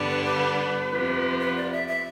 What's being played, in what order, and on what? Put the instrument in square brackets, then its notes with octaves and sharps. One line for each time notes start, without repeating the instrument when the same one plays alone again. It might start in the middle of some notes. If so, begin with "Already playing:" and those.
Already playing: [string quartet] G2 D3 G3 B3 D4
[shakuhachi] B4
B4
[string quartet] F2 C3 F3 B3
[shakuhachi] B4
D5
E5
E5